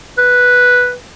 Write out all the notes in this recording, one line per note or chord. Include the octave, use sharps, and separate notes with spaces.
B4